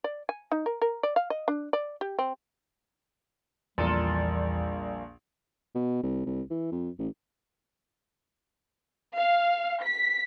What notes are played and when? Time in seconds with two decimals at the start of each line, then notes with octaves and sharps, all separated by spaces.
0.04 D5
0.29 G#5
0.52 D#4
0.66 A#4
0.82 A#4
1.03 D5
1.16 F5
1.30 D#5
1.48 D4
1.73 D5
2.01 G4
2.19 C4
3.78 A#1 E2 E3 G3 F4 A4 A#4
5.75 B2
6.03 C2
6.26 C2
6.50 E3
6.72 F2
6.99 A1
9.16 F5
9.84 B6